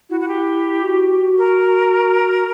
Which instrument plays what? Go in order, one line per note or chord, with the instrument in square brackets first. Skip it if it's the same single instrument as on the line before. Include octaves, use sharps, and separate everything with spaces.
[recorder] E4 [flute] F#4
[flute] F#4
G4
[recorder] F#4
[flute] A#4